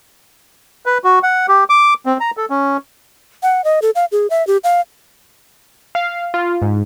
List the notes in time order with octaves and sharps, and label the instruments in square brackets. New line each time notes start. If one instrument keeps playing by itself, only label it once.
[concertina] B4
F#4
F#5
G4
D6
C4
A#5
A4
C#4
[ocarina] F#5
D#5
A4
F5
G#4
E5
G4
F5
[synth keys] F5
F4
G#2